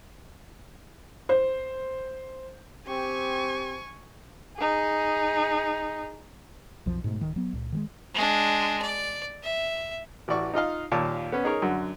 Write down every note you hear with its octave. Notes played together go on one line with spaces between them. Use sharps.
C5
C4 G4 G#5 C#6
D#4 G#4
B1 F2 F3
G#2 B2 A3
D1 D#3
F#3 B3
C#2 A#2
D#3 F3 G#3
G#3 D4
D5
E5
A1 E3 F#4 D5 C#6
D#4 F4 D#5 F5
D#2 A#2 C#5 F5 A5
B3 C#4
D#4 G#4 A#4 C#5
F#2 D3 F#4